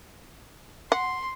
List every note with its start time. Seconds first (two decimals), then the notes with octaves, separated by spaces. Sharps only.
0.92 F#5 C6